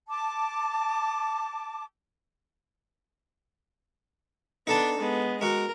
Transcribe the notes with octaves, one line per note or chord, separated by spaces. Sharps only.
A5 D6
B3 D4 D#4 A4 A5
G#3 B3
G#3 F#4 A#4